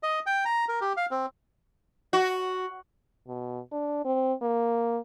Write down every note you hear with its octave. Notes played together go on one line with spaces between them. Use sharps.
D#5
G5
A#5
A#4
G4
F5
C4
F#4
B2
D4
C4
A#3